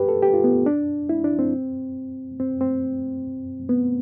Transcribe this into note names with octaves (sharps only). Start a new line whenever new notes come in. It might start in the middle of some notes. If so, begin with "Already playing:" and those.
Already playing: G4 B4
A4
G4
F4
B3
D4
E4
D4
C4
C4
C4
B3